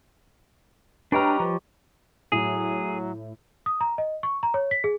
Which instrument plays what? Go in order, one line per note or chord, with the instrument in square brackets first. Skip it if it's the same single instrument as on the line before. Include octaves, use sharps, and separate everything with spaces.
[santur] G3 C#5 D#5 [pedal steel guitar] D4 G5 F6 [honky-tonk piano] B4 A#5
[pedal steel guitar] F3
[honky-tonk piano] A2 [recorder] F#3 [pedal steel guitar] G#4
[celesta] D#6
A#5
D#5
C#6
A#5
C#5
B6
G#4